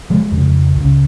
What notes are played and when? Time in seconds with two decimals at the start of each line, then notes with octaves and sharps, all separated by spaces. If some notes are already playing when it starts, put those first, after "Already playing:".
0.10 F3 G#3
0.32 F2 C#3
0.75 C#2 C#3